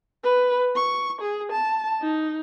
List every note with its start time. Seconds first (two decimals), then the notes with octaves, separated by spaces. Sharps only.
0.24 B4
0.76 C#6
1.22 G#4
1.52 A5
2.01 D#4